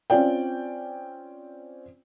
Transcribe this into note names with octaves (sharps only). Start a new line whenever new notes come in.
C4 C#4 F4 D5 G5